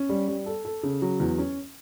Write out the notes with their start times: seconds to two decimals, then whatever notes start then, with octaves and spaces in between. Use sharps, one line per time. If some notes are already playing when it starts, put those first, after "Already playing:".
Already playing: C#4
0.09 G3
0.28 G3
0.46 A4
0.65 A4
0.83 C#3
1.02 F#3
1.20 E2
1.38 C#4